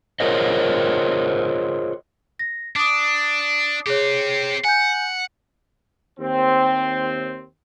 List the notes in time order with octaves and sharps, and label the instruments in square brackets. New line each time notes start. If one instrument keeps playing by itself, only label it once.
[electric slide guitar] F4 G#4 A#4 C5 C#5 D#5
[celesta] A#6
[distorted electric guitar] D4 [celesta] D6 D#6
[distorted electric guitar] C4 G4 [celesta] G#4 C#5
[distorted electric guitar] F#5 [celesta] G#5 G6
[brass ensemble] D#2 C4